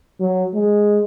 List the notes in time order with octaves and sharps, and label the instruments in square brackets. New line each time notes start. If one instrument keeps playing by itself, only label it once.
[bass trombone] F#3
G#3